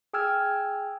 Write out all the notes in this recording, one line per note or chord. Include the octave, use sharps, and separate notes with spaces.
G#4 G5 G#5 E6 F6 G#6